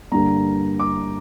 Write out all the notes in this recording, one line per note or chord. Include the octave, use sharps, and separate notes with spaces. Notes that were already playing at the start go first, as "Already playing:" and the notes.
G2 D3 G3 A#3 A#5
D6